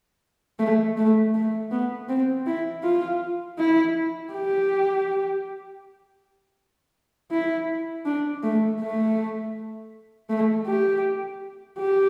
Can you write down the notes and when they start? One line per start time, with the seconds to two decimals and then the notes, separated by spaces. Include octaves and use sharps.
0.59 A3
0.97 A3
1.34 A3
1.71 B3
2.09 C4
2.46 E4
2.83 F4
3.58 E4
4.33 G4
7.31 E4
8.06 D4
8.43 A3
8.81 A3
10.30 A3
10.67 G4
11.79 G4